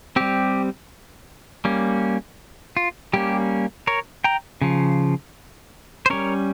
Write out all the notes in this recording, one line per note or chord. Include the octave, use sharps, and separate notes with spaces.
G3 C4 G4
G3 A#3 C#4
F4
G3 A#3 C#4 G4
A#4 C#5
G5 A#5
C#3 F3
C5
G3 C#4 A#4 C#5